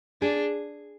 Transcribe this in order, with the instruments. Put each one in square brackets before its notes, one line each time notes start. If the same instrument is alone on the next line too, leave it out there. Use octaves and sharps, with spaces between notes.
[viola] D4 [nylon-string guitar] G#4